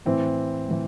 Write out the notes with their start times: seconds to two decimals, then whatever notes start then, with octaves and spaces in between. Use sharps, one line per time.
0.05 A2 E3 C4
0.68 A2 E3